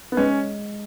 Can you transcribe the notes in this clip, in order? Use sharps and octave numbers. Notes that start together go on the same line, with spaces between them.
B3
G#3 C#4